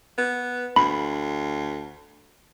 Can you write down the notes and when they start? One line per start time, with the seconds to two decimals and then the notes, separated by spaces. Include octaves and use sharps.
0.18 B3
0.76 D2 B5